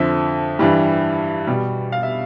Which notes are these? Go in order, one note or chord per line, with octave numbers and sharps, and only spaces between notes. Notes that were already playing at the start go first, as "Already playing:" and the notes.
Already playing: F2 D3 F3 E5
G2 E3 G3
B2 G3
F5
E5